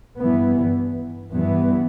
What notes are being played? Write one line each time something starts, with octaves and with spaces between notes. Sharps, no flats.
G2 E3 B3
G2 E3 B3